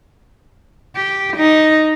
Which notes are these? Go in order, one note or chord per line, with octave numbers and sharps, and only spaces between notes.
G4
D#4